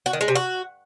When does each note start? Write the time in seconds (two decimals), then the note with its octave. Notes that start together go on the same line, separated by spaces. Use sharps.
0.06 F#4
0.13 D#3
0.21 G#3
0.28 C3
0.35 F#4